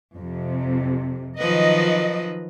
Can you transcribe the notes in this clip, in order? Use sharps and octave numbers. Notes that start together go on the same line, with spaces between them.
F2 C3
D#3 F3 F#3 B4 D#5